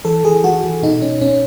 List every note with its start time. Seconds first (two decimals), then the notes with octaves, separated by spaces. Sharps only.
0.05 E3 A4
0.24 E3 G#4
0.44 E3 F#4
0.63 E3
0.82 B2 D#4
1.02 B2 C#4
1.21 B2 C#4